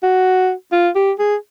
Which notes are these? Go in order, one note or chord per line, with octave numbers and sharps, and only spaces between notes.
F#4
F4
G4
G#4